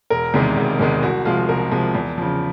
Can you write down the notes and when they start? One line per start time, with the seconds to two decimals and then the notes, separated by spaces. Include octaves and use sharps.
0.10 E1 A#4
0.34 E2 C3 D#3 G#3
0.57 E1
0.80 E2 C3 D#3 G#3
1.03 C2 F#4
1.25 C3 F3 G#3 F4
1.49 C2 A#4
1.71 C3 F3 G#3
1.95 E2
2.18 C#3 F3